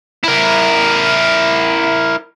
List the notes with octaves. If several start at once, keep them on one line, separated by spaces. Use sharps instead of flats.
E4 A#4